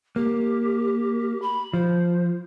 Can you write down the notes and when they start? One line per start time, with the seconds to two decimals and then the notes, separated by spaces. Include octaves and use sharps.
0.16 A#3 G4
1.42 B5
1.73 F3 C5